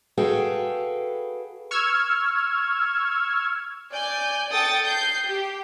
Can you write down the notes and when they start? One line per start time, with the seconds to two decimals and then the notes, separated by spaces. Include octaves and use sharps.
0.17 F#4 G#4 A4 B4 F5 G5
1.71 C#6 E6 F6 G#6
3.92 D5 G#5 G6
4.51 A4 G5 D#6 A6 C#7
4.85 G6 C7
5.28 G4